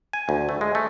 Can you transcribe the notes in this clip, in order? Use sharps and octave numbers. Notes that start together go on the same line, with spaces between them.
G#5
D2
A3
G#3
A3